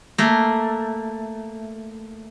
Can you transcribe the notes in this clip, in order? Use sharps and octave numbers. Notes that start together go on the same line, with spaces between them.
A3 A#3